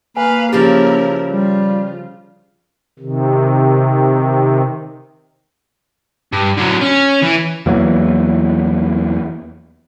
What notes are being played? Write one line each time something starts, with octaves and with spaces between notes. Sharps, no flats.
A#3 B4 F5 G#5
C#3 F3 E4 G4 A#4 D5
G3 F4
C3 D#3
G2
D3 F#3
C#4
E3
E2 E3 F#3 A#3